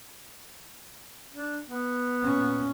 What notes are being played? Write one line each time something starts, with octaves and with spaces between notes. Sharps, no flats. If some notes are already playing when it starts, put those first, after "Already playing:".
D4
B3
A#2 C#4